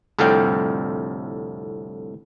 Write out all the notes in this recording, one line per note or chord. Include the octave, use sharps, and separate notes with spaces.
C2 F2 A2 D3 F5 G5